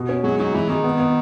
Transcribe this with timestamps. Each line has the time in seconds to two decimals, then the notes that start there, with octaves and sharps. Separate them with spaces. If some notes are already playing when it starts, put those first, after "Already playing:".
Already playing: B2
0.09 C#4
0.24 F#3 G#3
0.39 F#3 D#4
0.54 E3 G#3
0.70 D#3 G#3
0.84 B3
0.99 B3